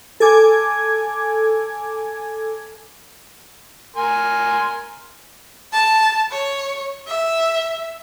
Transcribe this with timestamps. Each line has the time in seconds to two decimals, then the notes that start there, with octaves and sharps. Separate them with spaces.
0.20 A4 G#5 D6 G#6
3.96 A#4 G#5 C6
5.73 A5
6.32 C#5
7.07 E5